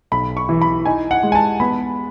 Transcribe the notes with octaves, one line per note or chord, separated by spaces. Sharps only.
B1 B5
C#6
E3
B5
D#4 G#5
F#5
G#3
G#5
A5
B3 B5